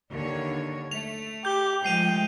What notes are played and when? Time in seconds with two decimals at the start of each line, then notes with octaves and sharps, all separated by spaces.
0.10 D#2 D3 C#5
0.91 A3 F7
1.45 G4 G6 G7
1.84 F3 G#3 A3 G5 C7 D#7 F7